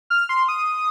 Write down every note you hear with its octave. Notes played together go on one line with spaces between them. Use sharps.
F6
C6
D#6